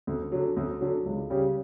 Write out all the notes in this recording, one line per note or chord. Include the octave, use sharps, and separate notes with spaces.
D2
D3 F#3
D2
D3 F#3
C#2
C#3 G3 C#4 G4